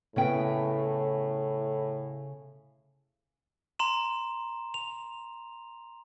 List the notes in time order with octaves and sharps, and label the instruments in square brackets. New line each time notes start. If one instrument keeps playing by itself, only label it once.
[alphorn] A2 [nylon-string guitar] C#3 B3 G5
[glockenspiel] A#5 C6 E7
F7